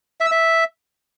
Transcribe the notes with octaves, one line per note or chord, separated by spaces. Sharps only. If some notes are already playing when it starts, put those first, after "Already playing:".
E5
E6
E5